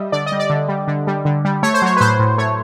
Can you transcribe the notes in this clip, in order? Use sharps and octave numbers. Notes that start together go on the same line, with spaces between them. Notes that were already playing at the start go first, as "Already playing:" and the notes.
Already playing: G3 D#5 E5
D3 D5
D#5
G3
D5
D3
G3
D3
G3
D3
G3
A3 C#5
C5
F#3 C#5
B4
A2 C5
A2
A3 C#5